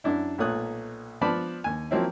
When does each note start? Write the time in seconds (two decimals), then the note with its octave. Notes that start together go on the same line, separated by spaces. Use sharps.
0.04 F#2 D4 E4
0.38 B1 A#2 A3 C#5 D#6 F#6
1.21 F3 B3 B4 D5 A5 B5
1.64 D#2 G#5
1.91 F3 F#3 A#3 C4 C#4 E4